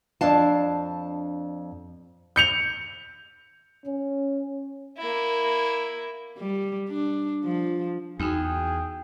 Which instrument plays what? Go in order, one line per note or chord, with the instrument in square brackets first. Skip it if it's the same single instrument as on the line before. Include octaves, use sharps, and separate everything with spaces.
[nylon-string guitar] F2 D4 F5 A5
[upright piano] G6 C#7 F7
[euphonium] C#4
[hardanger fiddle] A#3 E4
[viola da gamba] G3
D4
F3
[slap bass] E2 [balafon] D#4 F#4 [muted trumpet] G#4 [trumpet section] G5